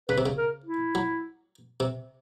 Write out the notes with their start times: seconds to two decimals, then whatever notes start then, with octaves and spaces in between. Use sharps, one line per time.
0.09 C#3 B4
0.18 C3
0.26 C#3
0.38 A#4
0.66 E4
0.95 F#3
1.80 C3